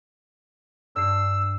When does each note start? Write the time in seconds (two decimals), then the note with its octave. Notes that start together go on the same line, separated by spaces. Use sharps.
0.96 G2 E6 C7